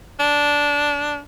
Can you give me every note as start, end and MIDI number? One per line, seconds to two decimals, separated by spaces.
0.20 1.19 62